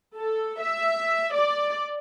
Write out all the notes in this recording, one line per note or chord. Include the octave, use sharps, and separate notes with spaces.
A4
E5
D5